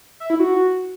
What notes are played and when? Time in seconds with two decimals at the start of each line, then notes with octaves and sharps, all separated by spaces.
0.20 E5
0.30 E4
0.40 F#4